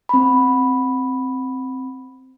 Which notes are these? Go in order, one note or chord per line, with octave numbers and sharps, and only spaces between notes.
C4 B5